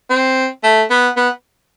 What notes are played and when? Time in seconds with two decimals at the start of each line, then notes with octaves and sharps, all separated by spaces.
0.10 C4
0.64 A3
0.90 B3
1.16 B3